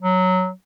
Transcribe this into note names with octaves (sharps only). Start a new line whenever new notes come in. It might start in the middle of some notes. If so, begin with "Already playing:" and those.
F#3